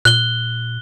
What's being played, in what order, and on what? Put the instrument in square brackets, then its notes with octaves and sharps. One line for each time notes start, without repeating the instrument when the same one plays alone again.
[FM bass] A#2 [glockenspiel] F#6 G7